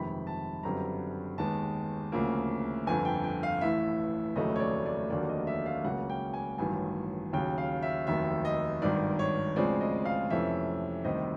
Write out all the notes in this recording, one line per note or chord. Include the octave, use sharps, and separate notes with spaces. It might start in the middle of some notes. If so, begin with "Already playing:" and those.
Already playing: G1 F2 C3 D#3 G#3 B5
A5
G1 F#2 D3 G3 C4 A#5
D#2 D#3 G#3 B3 A5
D2 C#3 F3 A#3
G1 F2 D3 G#5
G5
G5
F5
A1 A2 E3 E5
F1 D#2 C#3 F#3 A3 D#5
C#5
D5
D5
F1 D#2 D3 F#3 A#3 D5
D#5
E5
F5
C#2 C#3 F#3 A#3 F#5
G5
G#5
A1 G2 D#3 F#3 G#5
D#2 C#3 F#3 G5
F5
E5
F1 D#2 D#3 F#3 E5
D#5
G#1 G2 D#3 D5
C#5
D2 C#3 F3 G#3 C4 D5
D#5
F5
F2 C3 E3 A3 C#4 E5
D2 C3 D#3 G3 C4 D#5